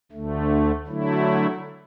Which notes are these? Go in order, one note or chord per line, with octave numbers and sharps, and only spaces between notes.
D2 D3 A3
D3 F#3 A3 E4